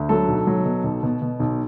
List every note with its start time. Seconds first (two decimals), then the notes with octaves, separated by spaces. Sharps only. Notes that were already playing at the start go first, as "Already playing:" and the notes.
Already playing: D2
0.09 F#3 A4
0.28 B1
0.47 F#3
0.65 B2
0.84 B1
1.03 B2
1.22 B2
1.40 B1